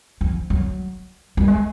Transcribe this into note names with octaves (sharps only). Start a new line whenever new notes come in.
F3
F#3
G3
G#3